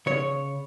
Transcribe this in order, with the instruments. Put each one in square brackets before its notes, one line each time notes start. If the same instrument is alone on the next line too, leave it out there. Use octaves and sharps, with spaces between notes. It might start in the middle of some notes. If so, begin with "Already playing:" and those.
[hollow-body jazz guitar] C#3 C#5